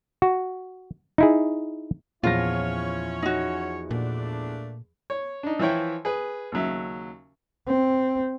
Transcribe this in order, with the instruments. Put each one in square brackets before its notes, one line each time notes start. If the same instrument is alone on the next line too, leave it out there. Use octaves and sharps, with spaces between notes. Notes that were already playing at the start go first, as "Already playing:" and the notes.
[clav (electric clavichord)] F#4
D#4 E4 G#4
[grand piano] E2 F3 A#6 [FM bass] A#2 [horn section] C#4 E4 C#5 [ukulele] F4
[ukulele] D#4 F#4
[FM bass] A#2 [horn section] A3 A#3 D4
[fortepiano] C#5
D4 D#4
E3 F3 E4 C#5 G5
G#4 B4
D#2 C#3 F#3 E5
[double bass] C4